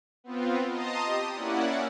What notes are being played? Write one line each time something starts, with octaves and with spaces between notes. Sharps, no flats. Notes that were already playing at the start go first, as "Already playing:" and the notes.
B3 C4 F4
D#5 A5 A#5 C6 D#6
G4 D#6
A#3 C#4 E4 D5 F#5